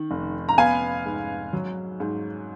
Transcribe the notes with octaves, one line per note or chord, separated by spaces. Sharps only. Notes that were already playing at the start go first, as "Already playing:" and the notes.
Already playing: D#3
F1
A#5
B3 F5 G#5
G#2
F#3
G#2